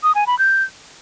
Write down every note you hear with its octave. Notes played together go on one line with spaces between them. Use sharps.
D#6
G#5
B5
G6